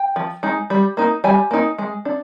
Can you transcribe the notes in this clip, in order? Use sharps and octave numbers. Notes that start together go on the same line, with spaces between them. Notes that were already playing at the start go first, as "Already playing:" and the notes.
Already playing: G5
F3
G#3 D#4
G3
A#3 D#4
G3 G#5
A#3 D#4
G#3
D4